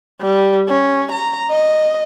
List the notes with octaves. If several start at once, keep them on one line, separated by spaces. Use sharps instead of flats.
G3
C#4
A#5
D#5